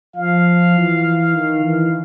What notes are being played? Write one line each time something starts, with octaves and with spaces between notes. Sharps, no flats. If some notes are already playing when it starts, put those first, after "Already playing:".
F3 F5
E3
D#3
E3